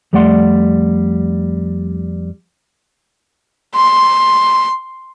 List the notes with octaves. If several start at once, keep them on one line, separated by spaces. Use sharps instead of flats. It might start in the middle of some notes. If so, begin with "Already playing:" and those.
F2 G3 A3 D5 F#5 C6
C6